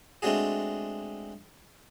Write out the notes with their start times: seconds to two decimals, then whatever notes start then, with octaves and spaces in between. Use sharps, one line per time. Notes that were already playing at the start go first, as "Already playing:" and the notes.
0.22 G#3 A3 C4 D4 F#4 G#4